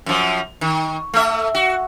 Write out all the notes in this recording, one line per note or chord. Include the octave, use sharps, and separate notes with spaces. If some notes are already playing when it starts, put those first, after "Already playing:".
F#2 F3
D#3
A3 E5
F#4